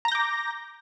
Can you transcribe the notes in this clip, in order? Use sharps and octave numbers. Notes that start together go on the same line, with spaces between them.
A#5 D6 G6 A#6